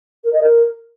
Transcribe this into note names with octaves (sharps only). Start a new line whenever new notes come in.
A#4
D#5
A#4